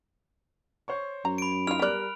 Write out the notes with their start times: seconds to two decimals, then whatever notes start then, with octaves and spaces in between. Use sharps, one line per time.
0.88 C5 C#5 C#6
1.25 F#2 A#5
1.38 B5 D7
1.67 E3 D#4 F4 F6 F7
1.79 G3 B3 A#4 D5 F#6